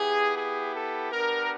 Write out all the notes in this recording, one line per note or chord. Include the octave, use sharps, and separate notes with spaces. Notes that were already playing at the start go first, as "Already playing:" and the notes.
Already playing: B3 E4 G4 G#4
G#4
A4
B3 D4 G4 A#4